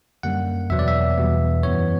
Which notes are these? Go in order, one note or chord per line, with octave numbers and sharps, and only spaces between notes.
F#2 D3 G3 A#3 F#5
E2 B2 F#3 B3 E5
D5
E5
E2 B2 G3 B3
F#2 E3 B3 C#5